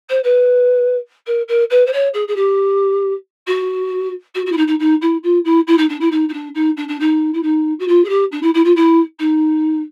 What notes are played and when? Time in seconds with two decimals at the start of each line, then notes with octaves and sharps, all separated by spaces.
0.09 C5
0.23 B4
1.26 A#4
1.48 A#4
1.70 B4
1.86 C5
1.92 C#5
2.14 G#4
2.28 G#4
2.36 G4
3.47 F#4
4.35 F#4
4.46 F#4
4.52 E4
4.57 D#4
4.67 D#4
4.79 D#4
5.01 E4
5.23 F4
5.44 E4
5.67 E4
5.78 D#4
5.89 D4
6.00 E4
6.11 D#4
6.29 D#4
6.33 D4
6.55 D#4
6.77 D4
6.88 D4
7.00 D#4
7.34 E4
7.43 D#4
7.79 F#4
7.88 F4
8.04 G#4
8.09 G4
8.31 D4
8.42 E4
8.54 E4
8.65 F4
8.76 E4
9.19 D#4